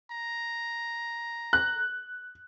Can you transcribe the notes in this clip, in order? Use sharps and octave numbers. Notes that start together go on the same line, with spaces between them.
A#5
F#6